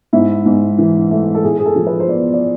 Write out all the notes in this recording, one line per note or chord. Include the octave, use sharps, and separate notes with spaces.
G#2 E4
G#2
E3
A3
A4
A2 G#4
G#4
A4
F3
B4
C5
B3 D5
D5